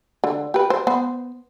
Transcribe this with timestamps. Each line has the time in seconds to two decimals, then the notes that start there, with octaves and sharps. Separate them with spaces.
0.24 D3
0.54 G4 B4
0.70 C5
0.87 B3 C5